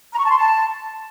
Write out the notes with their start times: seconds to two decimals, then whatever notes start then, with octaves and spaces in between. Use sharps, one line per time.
0.12 A#5
0.18 C#6
0.25 A5
0.31 C6
0.38 A5